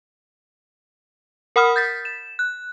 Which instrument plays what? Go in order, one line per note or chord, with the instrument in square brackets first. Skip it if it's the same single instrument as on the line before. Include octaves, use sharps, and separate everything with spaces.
[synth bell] A#4 F#5 B5 D#6 F6
G6 A6 B6
E7
F#6